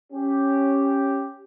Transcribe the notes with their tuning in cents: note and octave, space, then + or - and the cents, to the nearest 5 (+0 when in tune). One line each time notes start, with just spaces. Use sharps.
C#4 -10 G4 +0